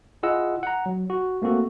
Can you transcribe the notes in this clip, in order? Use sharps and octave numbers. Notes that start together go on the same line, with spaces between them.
E4 F4 G#4 D#5 F#5 E6
F#5 A#5
F#3
F#4
A3 A#3 C4 F#4 A4